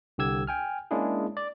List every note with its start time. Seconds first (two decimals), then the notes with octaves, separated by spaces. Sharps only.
0.18 C2 D3 G4 E6 G#6
0.47 G5 G#5 F6
0.91 G#3 A#3 C#4 D4 E4 G#4
1.37 D5